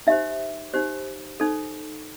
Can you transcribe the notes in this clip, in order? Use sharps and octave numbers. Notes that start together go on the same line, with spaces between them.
D#4 G4 C5 E5
D#4 G4 C5
D#4 A4 C5